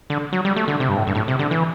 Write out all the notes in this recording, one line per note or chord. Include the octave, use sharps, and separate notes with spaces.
D3
F#3
G3
A3
D3
C3
G2
A2
G2
A2
C3
D3
E3